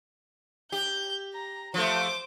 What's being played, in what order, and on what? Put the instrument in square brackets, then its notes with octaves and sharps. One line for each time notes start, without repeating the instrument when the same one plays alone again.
[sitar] G4 [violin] G6
[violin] A#5
[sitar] F3 A3 [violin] C5 D6